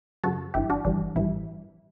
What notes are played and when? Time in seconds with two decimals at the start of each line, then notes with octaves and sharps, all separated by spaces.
0.24 F#2 C#3 F#3 F#4 A4
0.54 G1 G2 E3 E4 G4
0.70 D4 F#4
0.85 G1 G2 E3 G3 D4
1.15 A1 G2 E3 G3 E4